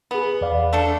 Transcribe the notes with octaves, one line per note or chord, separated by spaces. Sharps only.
B3 G#4 B5
E2 D5 F5
A3 D4 A4